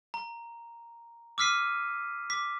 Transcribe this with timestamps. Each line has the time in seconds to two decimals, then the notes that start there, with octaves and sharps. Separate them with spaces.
0.14 A#5
1.38 D6 E6 F6 B6 C7 D#7
2.30 D6 B6